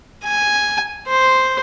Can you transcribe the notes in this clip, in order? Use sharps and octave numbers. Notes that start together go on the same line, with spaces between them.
G#5
C5